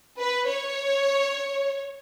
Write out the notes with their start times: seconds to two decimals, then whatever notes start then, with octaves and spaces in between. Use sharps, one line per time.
0.19 B4
0.48 C#5